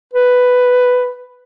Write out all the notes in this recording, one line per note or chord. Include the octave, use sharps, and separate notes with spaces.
B4